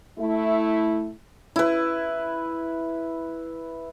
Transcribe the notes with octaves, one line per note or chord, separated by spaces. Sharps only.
A3 E4
E4 B4